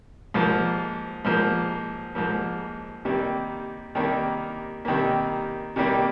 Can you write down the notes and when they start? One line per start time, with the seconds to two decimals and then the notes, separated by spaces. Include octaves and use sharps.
0.34 G#2 F3 A#3
1.25 G#2 F3 A#3
2.15 G#2 F3 A#3
3.05 C3 D#3 G3 A#3
3.95 C3 D#3 G3 A#3
4.85 C3 D#3 G3 A#3
5.76 C3 D#3 G3 A#3